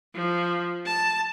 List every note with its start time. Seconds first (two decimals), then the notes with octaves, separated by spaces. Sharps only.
0.14 F3
0.86 A5